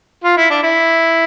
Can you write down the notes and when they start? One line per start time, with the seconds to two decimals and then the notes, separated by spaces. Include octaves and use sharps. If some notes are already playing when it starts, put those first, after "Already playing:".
0.24 F4
0.37 E4
0.50 D4
0.63 E4